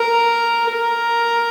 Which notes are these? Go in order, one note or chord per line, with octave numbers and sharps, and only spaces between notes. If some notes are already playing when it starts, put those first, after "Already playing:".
Already playing: A#4
A#4